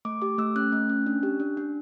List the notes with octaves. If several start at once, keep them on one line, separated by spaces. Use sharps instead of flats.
A3 D6
G4 D6
A3 E6
C#4 F#6
A3
C#4
D4
G4
D4
D4